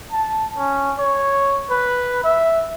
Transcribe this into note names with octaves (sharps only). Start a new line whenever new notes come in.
A5
C#4
C#5
B4
E5